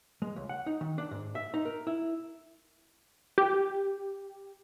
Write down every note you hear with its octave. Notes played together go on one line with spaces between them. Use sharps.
G#3
C#2
F#5
D#4
D#3
D4
G#2
E5
D#4
A#4
E4
G4